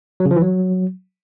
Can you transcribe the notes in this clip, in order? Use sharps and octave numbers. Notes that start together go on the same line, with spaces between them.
F#3
C#3
F3
E3
F#3